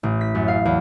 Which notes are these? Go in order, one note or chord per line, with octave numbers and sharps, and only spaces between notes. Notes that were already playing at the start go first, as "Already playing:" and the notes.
A1
B6
F#2
F5
E2